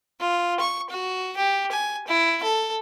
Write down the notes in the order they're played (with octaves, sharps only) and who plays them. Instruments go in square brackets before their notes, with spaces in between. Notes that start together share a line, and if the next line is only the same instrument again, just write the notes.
[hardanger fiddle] F4
C#6
F#4
G4
G#5
E4
A4